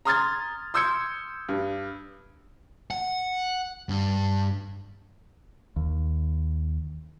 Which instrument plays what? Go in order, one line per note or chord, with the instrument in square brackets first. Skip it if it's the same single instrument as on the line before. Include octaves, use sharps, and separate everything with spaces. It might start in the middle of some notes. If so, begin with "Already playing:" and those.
[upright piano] A#5 C6 D#6 F6 G#6 A6
C6 D#6 E6 G6 G#6 C#7
G2
[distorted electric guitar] F#5
G2
[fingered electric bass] D#2